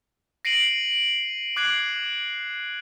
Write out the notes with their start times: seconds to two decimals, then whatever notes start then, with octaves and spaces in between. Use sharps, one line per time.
0.45 A#6 C7 D7 D#7 F#7
1.56 D6 F#6 G#6 C7 D7 F#7